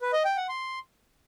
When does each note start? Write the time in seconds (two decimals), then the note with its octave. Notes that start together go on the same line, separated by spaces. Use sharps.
0.01 B4
0.13 D#5
0.25 G5
0.37 F#5
0.49 C6